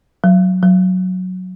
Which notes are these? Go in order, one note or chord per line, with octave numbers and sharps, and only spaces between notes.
F#3
F#3